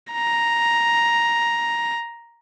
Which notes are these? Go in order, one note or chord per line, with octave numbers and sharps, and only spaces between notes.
A#5